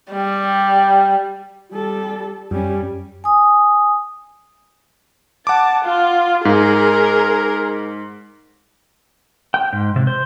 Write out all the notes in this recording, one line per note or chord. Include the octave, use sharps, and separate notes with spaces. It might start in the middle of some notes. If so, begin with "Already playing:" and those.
G3
G3 A4
F#2 G3 C#4
G#5 D#6
F#5 A5 D6
F4
G#2 G#4 A#4
G5
G#2
C3
C5